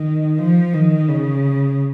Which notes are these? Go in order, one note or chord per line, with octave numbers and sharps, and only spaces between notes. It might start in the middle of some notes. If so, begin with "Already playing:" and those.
Already playing: D#3
F3
D#3
C#3